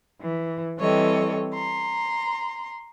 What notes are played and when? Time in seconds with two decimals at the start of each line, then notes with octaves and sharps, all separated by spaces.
0.20 E3
0.79 E3 G3 C4 A4 C#5 D#5
1.53 A#5 C6